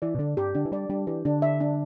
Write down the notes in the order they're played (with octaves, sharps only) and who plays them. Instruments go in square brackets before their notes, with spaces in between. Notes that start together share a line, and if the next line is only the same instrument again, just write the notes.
[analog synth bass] E3 [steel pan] D5
[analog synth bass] B2
[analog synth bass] D3 [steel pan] D4
[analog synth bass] G2 [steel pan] G4
[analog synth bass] D3 [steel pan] D4
[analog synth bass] E3
[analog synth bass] G3 [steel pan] D5
[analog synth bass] G3 [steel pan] D4
[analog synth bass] E3 [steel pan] G4
[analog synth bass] D3 [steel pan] D4
[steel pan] E5
D4